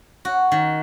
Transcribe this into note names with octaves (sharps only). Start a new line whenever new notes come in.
F#4
D#3